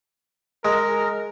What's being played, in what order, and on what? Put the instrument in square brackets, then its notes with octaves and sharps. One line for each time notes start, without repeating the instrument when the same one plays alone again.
[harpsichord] G#3 [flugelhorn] A#4